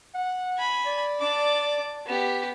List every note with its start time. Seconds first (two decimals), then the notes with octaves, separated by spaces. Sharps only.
0.15 F#5
0.58 G#5 B5
0.86 D5
1.20 D4 D6
2.06 B3 G4